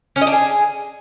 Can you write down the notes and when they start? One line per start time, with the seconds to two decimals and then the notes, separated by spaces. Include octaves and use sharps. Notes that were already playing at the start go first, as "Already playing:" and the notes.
0.16 C#4
0.21 D#5
0.27 D4
0.32 G#4